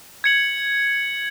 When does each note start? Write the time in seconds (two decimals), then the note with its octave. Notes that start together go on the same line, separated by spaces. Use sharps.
0.24 G#6 C#7 F#7